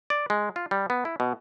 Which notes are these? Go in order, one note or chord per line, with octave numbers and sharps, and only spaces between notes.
D5
G#3
F4
G3
B3
E4
B2